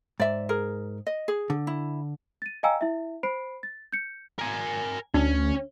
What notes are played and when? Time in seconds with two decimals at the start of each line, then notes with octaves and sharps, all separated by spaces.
0.20 G#2 D5 E5
0.49 G#4 A#4
1.07 D#5
1.28 G#4
1.50 D3
1.67 E4
2.42 A6 D#7
2.63 D#5 F5 G5 G#5 A#5 E6
2.81 E4 E5
3.23 C5 B5 C7 D7
3.63 A6
3.92 G6 C#7
4.39 A#4 G#5
5.14 D2 C#4 D4